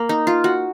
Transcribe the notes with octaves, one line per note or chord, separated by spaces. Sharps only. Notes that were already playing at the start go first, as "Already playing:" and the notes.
Already playing: A#3
D#4
F4
F#4